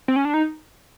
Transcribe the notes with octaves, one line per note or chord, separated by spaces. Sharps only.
C4
C#4
D4
D#4